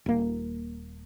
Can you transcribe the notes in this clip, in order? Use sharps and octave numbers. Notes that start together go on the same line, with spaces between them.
D#1 A#3